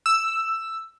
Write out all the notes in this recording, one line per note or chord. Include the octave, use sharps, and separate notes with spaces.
E6